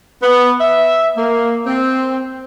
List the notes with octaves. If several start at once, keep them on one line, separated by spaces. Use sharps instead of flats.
B3
E5
A#3
C4